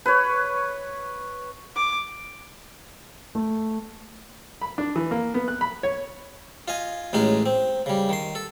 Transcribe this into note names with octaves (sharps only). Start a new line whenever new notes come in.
B4 C#5
D6
A3
B5
D4
E3
A#3
B3
F#6
B5
C#5
F4 D#5 G#5
A1 A2 G#3 C#4 D#4 G#4
C4
C#3 G3
D#3 C6
A4